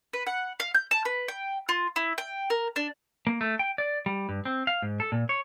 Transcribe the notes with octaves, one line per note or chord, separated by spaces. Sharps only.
B4
F#5
F5
G6
A5
B4
G5
F4
E4
G5
A#4
D4
A#3
A3
G5
D5
G3
G2
C4
F5
G#2
A4
A#2
C#5